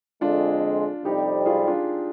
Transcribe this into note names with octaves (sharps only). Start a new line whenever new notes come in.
F2 D3 G#3 D4 F4
F2 C3 G3 D#4 G4
F4 G#4
D4 F4